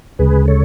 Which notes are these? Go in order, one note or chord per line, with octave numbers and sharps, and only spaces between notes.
D2 C#3 G#3 G#4 B4
A4 C#5